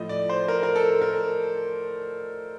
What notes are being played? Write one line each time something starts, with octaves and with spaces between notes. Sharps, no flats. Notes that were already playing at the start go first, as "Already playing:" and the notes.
Already playing: A2 F3 A3 D#5
D5
C5
A#4
A#4
A4
A#4